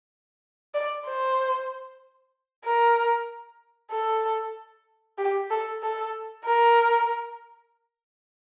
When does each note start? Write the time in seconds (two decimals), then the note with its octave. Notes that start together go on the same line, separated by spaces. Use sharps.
0.74 D5
1.06 C5
2.65 A#4
3.91 A4
5.18 G4
5.50 A4
5.83 A4
6.45 A#4